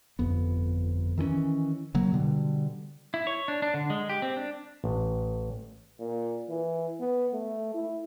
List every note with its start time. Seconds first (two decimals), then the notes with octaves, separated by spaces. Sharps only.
0.19 G1 F2 B3
1.18 D#3 E3 G3 C#4
1.94 C#3 F#3 A#3
2.13 B2 D3 G3
3.14 E4
3.27 C#5
3.48 D4
3.62 D4
3.74 D3
3.90 G#3
4.09 G4
4.22 C4
4.37 D4
4.84 A1
6.00 A#2
6.50 E3
7.00 B3
7.34 A3
7.74 E4